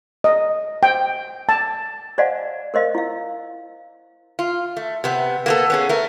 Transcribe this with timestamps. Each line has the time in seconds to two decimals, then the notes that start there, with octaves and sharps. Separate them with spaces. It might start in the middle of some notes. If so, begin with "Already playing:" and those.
0.24 D#5
0.83 G5
1.49 A5
2.18 C5 D5 D#5 F5 F#5 G#5
2.74 A#4 C5 D#5 F5
2.95 E4 F5
4.39 F4
4.77 A3
5.04 C3 B3
5.46 A#3 B3 A4
5.70 B3 C#4 G#4
5.89 A3 A#4